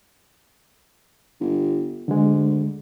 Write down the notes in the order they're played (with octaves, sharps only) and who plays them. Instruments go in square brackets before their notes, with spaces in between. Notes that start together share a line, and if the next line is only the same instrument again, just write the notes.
[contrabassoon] G1
[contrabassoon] D2 [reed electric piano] D3 G#3